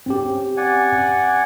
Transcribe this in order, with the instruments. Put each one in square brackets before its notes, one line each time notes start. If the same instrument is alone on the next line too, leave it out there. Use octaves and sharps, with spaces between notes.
[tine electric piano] C4 C#4 G4
[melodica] D5 F#5 G#5